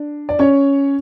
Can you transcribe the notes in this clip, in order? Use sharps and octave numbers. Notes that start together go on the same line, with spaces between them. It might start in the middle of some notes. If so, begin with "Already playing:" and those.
Already playing: D4
D5
C#4 C#5